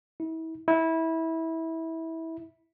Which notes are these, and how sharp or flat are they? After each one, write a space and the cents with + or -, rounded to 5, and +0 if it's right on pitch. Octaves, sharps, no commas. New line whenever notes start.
E4 -35
E4 -20